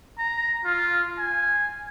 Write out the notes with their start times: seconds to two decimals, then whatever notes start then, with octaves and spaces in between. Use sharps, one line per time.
0.18 A#5
0.65 F4
1.18 G#5